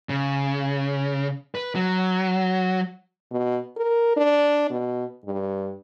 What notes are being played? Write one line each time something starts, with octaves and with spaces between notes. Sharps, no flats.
C#3
B4
F#3
B2
A#4
D4
B2
G2